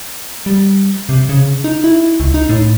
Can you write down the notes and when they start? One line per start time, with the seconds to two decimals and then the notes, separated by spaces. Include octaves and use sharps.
0.46 G3
1.09 C3
1.29 C#3
1.64 D#4
1.84 E4
2.20 C#2
2.34 D#4
2.49 A2